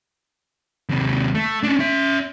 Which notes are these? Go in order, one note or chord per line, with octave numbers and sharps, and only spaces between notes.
D#2 C3
A3
C#4 D4
C#4 E5